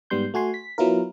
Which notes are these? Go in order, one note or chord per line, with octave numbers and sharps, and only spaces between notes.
G#2 G3 B3 C6 G6
A3 F#4 G#5 C6
B6
F#3 B3 E4 F4 A#4